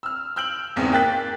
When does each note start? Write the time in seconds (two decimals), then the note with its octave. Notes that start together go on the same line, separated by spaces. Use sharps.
0.03 E6 F6
0.36 E6 F6 G6 D7 F#7
0.76 G#1 E2 B3 C4
0.92 A#3 G5 F#6 A6 B6